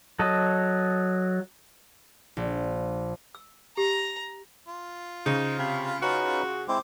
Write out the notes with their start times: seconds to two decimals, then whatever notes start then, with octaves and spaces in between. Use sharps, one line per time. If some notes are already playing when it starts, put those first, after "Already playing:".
0.19 F#3 A4 D#5
2.37 A#1
3.35 E6
3.77 G4 A#5
4.68 F4
5.26 C#3 D#4 C5
5.59 C3 F5 B5
6.02 C#4 D#4 F#4 B4
6.68 G#3 C4 E4 C5 D6